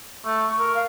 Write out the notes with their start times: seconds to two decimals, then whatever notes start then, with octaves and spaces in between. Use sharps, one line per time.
0.25 A3
0.43 C#6
0.59 A#4
0.75 F5